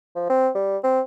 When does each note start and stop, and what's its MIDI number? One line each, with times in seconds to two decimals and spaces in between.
0.16 0.25 53
0.30 0.50 60
0.55 0.77 55
0.84 1.01 60